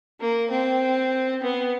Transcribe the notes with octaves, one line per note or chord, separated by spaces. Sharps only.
A#3
C4
B3